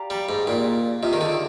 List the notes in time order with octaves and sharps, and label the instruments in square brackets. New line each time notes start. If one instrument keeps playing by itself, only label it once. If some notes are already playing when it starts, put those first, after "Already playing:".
Already playing: [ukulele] G4 D5 F5 A#5
[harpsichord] G3
G#2
[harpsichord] A#2 [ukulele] G4 D5 F5
[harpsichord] C3 [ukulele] F4 G#4 D#5
[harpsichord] D#3
D3